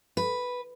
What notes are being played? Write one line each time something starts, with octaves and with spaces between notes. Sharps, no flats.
B4